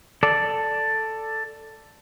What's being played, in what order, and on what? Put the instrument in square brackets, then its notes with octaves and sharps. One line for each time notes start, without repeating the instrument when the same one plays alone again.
[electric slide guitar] A4 D5